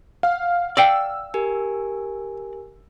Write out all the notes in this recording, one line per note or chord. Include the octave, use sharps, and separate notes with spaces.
F5 F#5 F6
D5 F5 G5 E6
G4 A#4 G#5